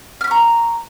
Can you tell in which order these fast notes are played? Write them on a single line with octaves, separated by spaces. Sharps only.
F6 B5 C#6 A#5